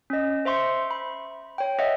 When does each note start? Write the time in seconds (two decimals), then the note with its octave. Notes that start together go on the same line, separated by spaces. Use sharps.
0.10 C#4 D#5
0.45 C5 E5 C6 C#6
0.91 B5
1.58 C#5 G5
1.79 C#5 D#5 E5 F#5